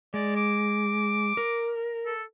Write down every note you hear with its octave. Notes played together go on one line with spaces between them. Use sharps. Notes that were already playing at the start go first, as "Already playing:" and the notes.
G#3 D5
D6
A#4
A4